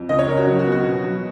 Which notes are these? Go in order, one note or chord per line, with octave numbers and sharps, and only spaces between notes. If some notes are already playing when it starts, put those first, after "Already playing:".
Already playing: F2
C#2 D#5
C#5
C#3 A#4
F#4
F#3
F#4
B3
F#4
B2
F#3